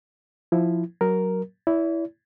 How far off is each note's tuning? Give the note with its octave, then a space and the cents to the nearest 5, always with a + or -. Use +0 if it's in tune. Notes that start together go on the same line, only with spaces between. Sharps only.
F3 +0 E4 +0
F#3 +5 A#4 +0
E4 +0 D5 -45